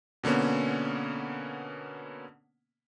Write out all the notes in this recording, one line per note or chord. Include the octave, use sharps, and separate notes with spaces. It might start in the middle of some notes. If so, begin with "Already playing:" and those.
B2 D3 A#3 B3 C#4